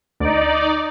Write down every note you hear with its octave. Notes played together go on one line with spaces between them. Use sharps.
D2 D#4 D5